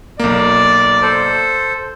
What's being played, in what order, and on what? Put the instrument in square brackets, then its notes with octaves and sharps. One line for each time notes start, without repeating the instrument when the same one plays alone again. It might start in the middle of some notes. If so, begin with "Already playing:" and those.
[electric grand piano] B1 A#3 [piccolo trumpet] D5
[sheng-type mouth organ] A4 C5